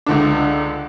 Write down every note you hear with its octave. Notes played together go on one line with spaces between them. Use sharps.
C#2 D3 D4